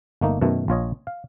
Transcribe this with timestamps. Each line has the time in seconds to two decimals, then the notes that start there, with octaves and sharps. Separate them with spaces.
0.21 G1 A3 A#3 D#4
0.41 F#2 B2 D#3 A3
0.68 A#1 F4 C#5 D#5
1.07 F5